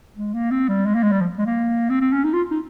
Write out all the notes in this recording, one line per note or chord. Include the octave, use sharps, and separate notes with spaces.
G#3
A#3
C4
G3
G#3
A#3
G#3
G3
F3
G#3
A#3
C4
C4
C#4
D#4
F4
D#4